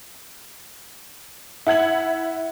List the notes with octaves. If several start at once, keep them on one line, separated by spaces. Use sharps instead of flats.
E4 F#5 G#6 F#7